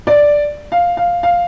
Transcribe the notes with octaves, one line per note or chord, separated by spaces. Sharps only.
D5
F5
F5
F5